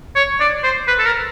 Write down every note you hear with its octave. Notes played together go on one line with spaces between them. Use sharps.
C#5
D5
C5
B4
A4
A#4